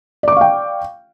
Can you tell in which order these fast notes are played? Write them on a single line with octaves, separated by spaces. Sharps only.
D5 D6 C#6 F5 G5